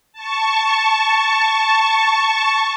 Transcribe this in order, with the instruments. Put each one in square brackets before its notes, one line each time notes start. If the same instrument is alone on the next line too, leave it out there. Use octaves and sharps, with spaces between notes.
[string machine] A5 C#6